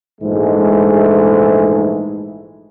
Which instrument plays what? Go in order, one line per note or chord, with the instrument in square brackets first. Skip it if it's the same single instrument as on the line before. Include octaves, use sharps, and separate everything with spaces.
[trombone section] A#1 G#2 E3 G#3 A3